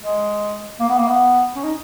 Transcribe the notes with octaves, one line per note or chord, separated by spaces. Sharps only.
G#3
A#3
B3
A#3
B3
C#4
D#4